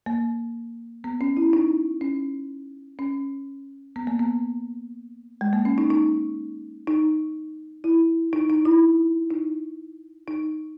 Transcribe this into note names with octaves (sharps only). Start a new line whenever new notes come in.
A#3
B3
C#4
E4
D#4
C#4
C#4
B3
A#3
B3
G#3
A#3
C#4
D#4
D#4
D#4
E4
D#4
D#4
E4
D#4
D#4